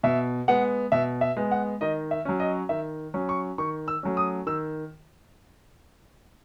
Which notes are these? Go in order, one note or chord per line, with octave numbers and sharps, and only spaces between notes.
B2 E5
G#3 B3 F#5
B2 E5
E5
G#3 B3
F#5
D#3 D#5
E5
F#3 C#4
D#5
D#3 E5
F#3 C#4
C#6
D#3 C#6
E6
F#3 A3 C#4
D#6
D#3 E6